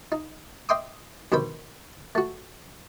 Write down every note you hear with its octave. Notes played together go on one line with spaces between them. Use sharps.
D#4
D#5 E5 G5 C6 D6 D#6
G2 B2 D#3 C5 B5
A3 F#4